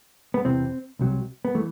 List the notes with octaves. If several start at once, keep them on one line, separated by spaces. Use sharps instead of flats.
B3
E2 C3 E3 C4
C2 C3 F#3
B3
E3 A3